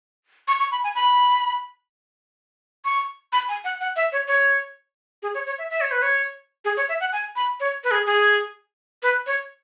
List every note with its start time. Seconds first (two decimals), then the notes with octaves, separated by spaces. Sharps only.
0.48 C#6
0.60 C#6
0.72 B5
0.84 G#5
0.95 B5
2.85 C#6
3.33 B5
3.49 G#5
3.64 F#5
3.81 F#5
3.96 E5
4.12 C#5
4.27 C#5
5.23 G#4
5.35 C#5
5.46 C#5
5.58 E5
5.70 E5
5.81 C#5
5.91 B4
6.02 C#5
6.65 G#4
6.77 C#5
6.89 E5
7.00 F#5
7.13 G#5
7.36 B5
7.60 C#5
7.84 B4
7.91 G#4
8.06 G#4
9.03 B4
9.27 C#5